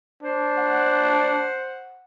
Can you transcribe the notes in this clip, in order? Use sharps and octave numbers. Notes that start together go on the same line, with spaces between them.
D4 C5
F#5